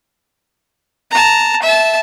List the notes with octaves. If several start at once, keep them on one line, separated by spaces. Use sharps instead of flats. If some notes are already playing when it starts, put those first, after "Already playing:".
A5 A#5
E5 A5